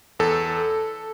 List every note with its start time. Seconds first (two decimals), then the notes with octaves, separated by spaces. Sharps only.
0.19 E2 A4